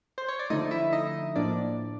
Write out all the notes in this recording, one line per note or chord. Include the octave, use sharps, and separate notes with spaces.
C5
C#5
D5
D3 F3 A3 D#4 D#5
E4 E5
D#4 D#5
A2 F3 A#3 D4 D5